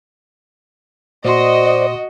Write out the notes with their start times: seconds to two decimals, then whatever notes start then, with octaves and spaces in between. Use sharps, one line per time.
1.25 A#2 F#4 C5 D5 D#5 C6